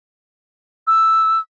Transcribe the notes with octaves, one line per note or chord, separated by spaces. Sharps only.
E6